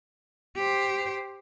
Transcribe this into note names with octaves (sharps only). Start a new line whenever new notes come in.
G4 C5